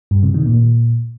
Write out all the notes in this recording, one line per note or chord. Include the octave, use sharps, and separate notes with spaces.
G2
C3
D#3
A#2